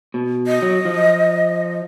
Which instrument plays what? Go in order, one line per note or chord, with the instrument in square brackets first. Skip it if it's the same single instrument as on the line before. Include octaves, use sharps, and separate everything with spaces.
[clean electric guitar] B2
[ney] D#5
[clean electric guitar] F#3
F3